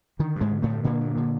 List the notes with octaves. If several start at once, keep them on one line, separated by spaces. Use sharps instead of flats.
D3 D#3
G2
G#2 G#3
D3
A2 A3
G2
A#2 D3 A#3
G2
D3